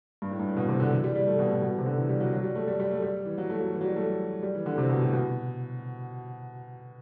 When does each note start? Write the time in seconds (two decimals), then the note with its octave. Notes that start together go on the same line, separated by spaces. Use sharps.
0.22 G2
0.31 A2
0.39 G2
0.48 A2
0.56 B2
0.69 C3
0.80 D3
0.92 E3
1.04 G3
1.15 G3
1.27 A3
1.39 B2
1.50 A2
1.63 B2
1.78 C3
1.86 D3
1.97 E3
2.09 G3
2.20 F#3
2.33 F#3
2.44 G3
2.55 A3
2.68 G3
2.80 G3
2.91 A3
3.02 G3
3.26 E3
3.38 F#3
3.50 A3
3.61 F#3
3.73 E3
3.81 F#3
3.84 G3
3.96 A3
4.43 G3
4.55 E3
4.66 D3
4.78 C3
4.89 B2
5.01 A2
5.13 B2